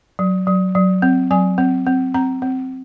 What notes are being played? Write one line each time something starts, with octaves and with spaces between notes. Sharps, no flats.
F#3
F#3
F#3
C4
F#3 G#5
C4
C4
C4 A#5
C4